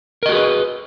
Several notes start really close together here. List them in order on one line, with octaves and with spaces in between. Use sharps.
A#4 D#5 F#4 G#4 B4